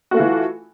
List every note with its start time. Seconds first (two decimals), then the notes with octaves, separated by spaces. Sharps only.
0.11 F#4
0.14 A3
0.17 F4
0.20 E3